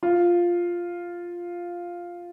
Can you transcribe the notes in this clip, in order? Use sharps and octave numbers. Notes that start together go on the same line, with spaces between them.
F4